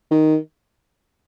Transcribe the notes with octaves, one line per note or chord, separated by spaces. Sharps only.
D#3